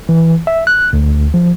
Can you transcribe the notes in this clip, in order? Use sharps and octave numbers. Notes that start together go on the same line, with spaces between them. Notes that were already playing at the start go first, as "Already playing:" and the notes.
E3
E5
F#6
D2
F3